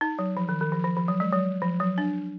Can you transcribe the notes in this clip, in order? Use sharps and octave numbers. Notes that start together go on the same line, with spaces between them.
D#4
F#3
F3
D#3
D#3
F3
F3
F3
F#3
G#3
F#3
F3
F#3
D4